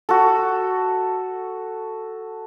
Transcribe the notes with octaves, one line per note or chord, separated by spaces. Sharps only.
F#4 A4